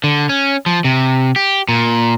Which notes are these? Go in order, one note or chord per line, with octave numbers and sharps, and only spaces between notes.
D3
C#4
F3
C3
G4
A#2